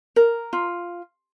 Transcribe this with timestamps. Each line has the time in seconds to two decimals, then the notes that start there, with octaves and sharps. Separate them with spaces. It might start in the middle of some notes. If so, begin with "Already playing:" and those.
0.16 A#4
0.53 F4